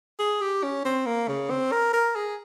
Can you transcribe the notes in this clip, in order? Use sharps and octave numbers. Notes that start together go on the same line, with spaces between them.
G#4
G4
C#4
C4
A#3
C#3
C4
A#4
A#4
G#4